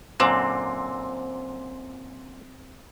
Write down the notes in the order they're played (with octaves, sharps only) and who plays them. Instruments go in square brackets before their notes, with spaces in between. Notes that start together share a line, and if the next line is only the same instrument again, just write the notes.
[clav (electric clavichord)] F#2 A#2 D3 [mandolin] C4